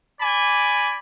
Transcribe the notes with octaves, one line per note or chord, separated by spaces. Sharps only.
D5 G#5 B5 D6